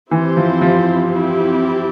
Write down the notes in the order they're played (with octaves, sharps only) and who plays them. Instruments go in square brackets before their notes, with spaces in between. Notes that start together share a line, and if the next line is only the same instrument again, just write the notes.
[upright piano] E3 [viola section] C4 E4 G4 C5
[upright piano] F3
F3
[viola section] C4 E4 G4